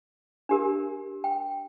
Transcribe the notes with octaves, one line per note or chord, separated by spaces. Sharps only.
D4 G4 A#4
G5